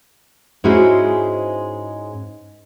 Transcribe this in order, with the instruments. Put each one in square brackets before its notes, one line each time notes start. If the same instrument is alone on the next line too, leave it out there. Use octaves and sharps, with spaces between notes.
[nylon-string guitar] G#2 G#3 C#4 E4 F#4 C5